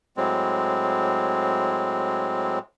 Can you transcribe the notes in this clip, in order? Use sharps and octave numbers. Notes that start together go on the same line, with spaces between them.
A2 F#3 G#3 C4